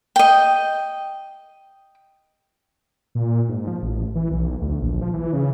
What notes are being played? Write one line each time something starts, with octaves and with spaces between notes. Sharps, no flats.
D#5 G5
A#2
G#2
F3
A1
E3
B1
D2
A#1
F3
E3
C#3